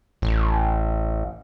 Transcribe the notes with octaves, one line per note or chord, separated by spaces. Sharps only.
A1